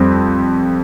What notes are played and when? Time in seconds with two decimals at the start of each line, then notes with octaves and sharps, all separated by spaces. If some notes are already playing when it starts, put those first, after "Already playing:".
Already playing: F2 G3 C4